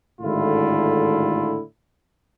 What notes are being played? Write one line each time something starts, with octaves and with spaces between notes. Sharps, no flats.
G#1 A2 D3 E4 F4